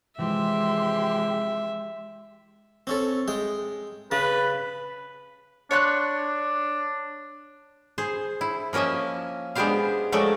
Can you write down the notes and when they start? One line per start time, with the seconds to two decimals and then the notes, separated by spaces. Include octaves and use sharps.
0.18 C3 E3 F3 G#3 G4 E5 C6
2.87 C4 C#4 A4
3.28 G#3 G5
4.11 C#3 B4 A5
5.71 D4 C#5 C6 F#6
7.98 G#4 C5
8.41 E4
8.73 F3 A#3 C#4 D#5 E5
9.55 G#3 B3 D4 G4 C5 F5
10.12 F3 F#3 G#3 A3 A4 D5